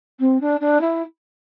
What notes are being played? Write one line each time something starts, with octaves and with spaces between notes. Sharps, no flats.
C4
D4
D4
E4